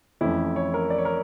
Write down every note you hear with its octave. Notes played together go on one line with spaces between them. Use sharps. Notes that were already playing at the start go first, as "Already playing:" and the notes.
F2 E3 A3 C#4 E4
C#5
A#4
D5
C#5
A#4